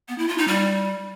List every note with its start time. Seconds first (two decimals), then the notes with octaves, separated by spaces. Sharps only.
0.08 B3
0.18 E4
0.28 F4
0.38 D#4
0.48 G3